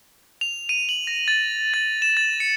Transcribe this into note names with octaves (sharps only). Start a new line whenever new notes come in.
F7
D#7
F#7
A#6
A6
A6
E7
A6
C#7